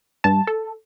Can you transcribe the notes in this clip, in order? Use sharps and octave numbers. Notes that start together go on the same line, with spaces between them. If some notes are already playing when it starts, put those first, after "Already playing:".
G2 A5
A4